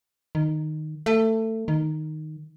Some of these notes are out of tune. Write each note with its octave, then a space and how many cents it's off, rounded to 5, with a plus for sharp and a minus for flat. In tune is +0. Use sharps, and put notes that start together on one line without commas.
D#3 -10
A3 +20
D#3 -5